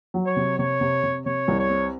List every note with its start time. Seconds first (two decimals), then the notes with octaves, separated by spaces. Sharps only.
0.14 F#3
0.26 C#5
0.36 C3
0.59 C3 C#5
0.81 C3
1.03 C3
1.26 C3 C#5
1.48 C2
1.59 C#5
1.70 C4